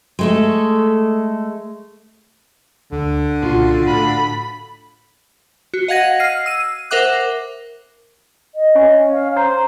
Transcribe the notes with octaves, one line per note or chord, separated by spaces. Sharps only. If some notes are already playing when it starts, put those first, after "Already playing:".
G#3 A3 A4
D2 D3
C2 A#2 C#3 F4 F#4
A2 F5 B5
F#4
D#5 F5 F#5 G#6 A#6 D#7
F6 C7 D#7
E6 D#7
A#4 C5 E5 F#5 D6 F#6
D#5
C#4
F5
C5 A#5